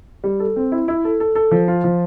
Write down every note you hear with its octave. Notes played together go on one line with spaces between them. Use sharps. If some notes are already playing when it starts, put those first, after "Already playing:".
G3
A4
C4
E4
E4
A4
A4
A4
F3
F4
F3